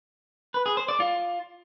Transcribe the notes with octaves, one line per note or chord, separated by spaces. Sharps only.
B4
G#4
C5
D5
F4